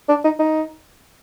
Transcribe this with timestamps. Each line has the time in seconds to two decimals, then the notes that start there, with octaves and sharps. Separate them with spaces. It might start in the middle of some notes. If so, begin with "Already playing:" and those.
0.09 D4
0.24 D#4
0.39 D#4